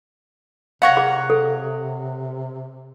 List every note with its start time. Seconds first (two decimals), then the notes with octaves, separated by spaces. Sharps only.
0.82 C3 A#4 C#5 F5 F#5
0.97 G#4
1.30 A4